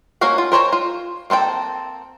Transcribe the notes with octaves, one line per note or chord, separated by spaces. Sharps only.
A#3 C#4 F#4 F5 A#5
F4
A#4 C5 C#5 A#5
F4
A#3 C4 A4 G5